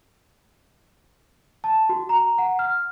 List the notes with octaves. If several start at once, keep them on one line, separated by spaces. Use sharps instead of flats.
A5
F#4
A#5
F#5
F6